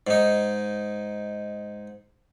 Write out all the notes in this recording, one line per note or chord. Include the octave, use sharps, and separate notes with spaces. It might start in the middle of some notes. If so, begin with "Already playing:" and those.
G#2 D#4